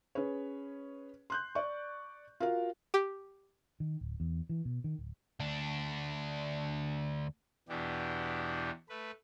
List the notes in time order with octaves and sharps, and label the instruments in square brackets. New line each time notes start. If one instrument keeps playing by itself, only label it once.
[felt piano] C#4 G#4 B4 C#5
C6 F#6 G6
D5 C#6
F4 F#4 A#4 F5
[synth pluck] G4
[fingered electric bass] D#3
D1
E2
E3
B2
D#3
D1
[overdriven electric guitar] D2 D4
[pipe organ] E2 B2 E3 D4 G4
A3 B4